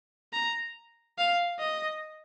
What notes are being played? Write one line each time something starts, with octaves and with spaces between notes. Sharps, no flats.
A#5
F5
D#5